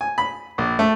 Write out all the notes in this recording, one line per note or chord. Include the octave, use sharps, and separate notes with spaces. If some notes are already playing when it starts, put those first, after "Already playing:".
G#5
B5
A#1
A3